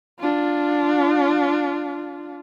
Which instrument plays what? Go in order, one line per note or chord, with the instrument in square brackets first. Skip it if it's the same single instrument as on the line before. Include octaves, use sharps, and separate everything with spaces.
[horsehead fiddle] D4 F4